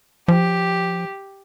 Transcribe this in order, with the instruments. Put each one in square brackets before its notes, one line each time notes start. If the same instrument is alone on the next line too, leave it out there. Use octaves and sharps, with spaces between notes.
[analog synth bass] F3 [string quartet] G4